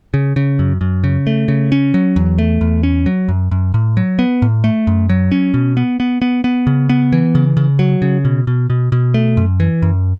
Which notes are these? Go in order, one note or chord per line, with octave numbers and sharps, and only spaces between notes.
C#3
C#3
F#2
F#2
C#3
A3
C#3
C#4
F#3
E2
A3
E2
C#4
F#3
F#2
F#2
A2
F#3
B3
A2
A3
F#2
F#3
C#4
B2
B3
B3
B3
B3
C#3
B3
E3
C#3
C#3
F#3
C#3
B2
B2
B2
B2
A3
F#2
E3
F#2